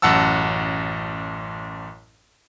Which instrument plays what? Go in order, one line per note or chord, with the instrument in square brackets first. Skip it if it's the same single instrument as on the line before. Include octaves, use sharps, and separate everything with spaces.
[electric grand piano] A1 F#2 F#5 A5 E6